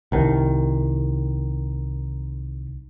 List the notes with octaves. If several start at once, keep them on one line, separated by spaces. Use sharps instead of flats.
C2 D#3